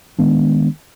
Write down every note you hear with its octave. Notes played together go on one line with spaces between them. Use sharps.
D#3 G#3 B3 D4